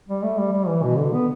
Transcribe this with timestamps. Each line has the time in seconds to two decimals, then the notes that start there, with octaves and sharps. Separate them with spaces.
0.09 G3
0.23 A3
0.38 G3
0.53 G3
0.68 E3
0.83 B2
0.98 D3
1.14 B3